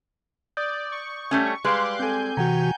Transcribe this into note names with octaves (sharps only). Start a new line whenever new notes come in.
D5 D#6 G6
C#6
G3 A3 C#4
G3 G#3 B4 F5 C6 D6 F#6
C4 A4 G#5 G6
C3 E3 F#4 F#5 G5 A#5